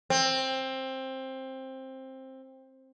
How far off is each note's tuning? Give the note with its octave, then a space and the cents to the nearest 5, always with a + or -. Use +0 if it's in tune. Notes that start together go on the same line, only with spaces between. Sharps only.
C4 +15